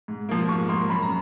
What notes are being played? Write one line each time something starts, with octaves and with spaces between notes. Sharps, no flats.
G#2
F3 A#3
G#2 C#6
F3 A#3 C6
F#2 B5
A#5